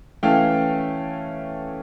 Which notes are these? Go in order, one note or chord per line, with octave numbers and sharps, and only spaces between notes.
E3 A3 C#4 F5 G5